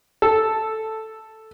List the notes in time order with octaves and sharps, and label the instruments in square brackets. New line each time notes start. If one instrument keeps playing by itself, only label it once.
[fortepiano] A4